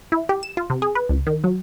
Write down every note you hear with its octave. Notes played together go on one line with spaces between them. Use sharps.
E4
G4
E7
F4
C3
G#4
B4
C#2
D#3
F#3